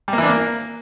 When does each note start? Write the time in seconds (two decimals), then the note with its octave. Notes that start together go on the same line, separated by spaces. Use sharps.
0.08 G3
0.13 A#3
0.18 E3
0.23 D4
0.28 A#3